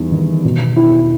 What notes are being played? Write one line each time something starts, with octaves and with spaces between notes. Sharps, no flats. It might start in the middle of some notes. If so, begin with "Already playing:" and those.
Already playing: E2 G3 D#4
D#3
B2
E4